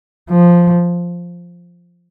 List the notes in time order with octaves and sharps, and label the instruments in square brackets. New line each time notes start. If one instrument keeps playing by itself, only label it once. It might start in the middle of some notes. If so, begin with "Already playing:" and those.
[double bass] F3